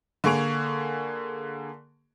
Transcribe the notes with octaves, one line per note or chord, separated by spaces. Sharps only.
D3 A#3 G#4 C#6 D7 F7